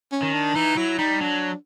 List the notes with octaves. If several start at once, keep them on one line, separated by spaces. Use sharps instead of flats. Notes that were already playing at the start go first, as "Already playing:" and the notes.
C#4
D#3
D4
E3 D#4
F#3 E4
G3 D#4
F#3 D4